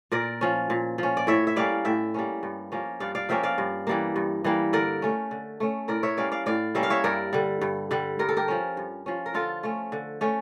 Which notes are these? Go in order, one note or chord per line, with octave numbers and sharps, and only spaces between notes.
A#2 A#4 D5
F3 C#4
A#2
F3 C#4
D5
A2 C#5 E5
E5
G3 A#3 C#4 D5 F5
A2 E5 G5
G3 A#3 C#4
G2
F3 A#3 C#4
G2 D5 F5
D5 F5
F3 A#3 C#4 E5 G5
D5 F5
G2
E3 G3 A#3
G2
E3 G3 A#3
D3 A#4 D5
A3 C#4
D3
A3 C#4
A2 A#4 D5
C#5 E5
G3 A#3 C#4 D5 F5
D5 F5
A2 D5 F5
G3 A#3 C#4 E5
F5
C#5 E5
G2 A#4 D5
D3 G3
G2
D3 G3
G2 A#4
A4
G4 A#4
F3 C#4
G2
F3 C#4
A#4
D3 F4 A4
A3 C#4
D3
A3 C#4